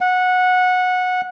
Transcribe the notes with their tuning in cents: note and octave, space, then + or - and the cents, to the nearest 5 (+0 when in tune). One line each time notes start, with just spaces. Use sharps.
F#5 -15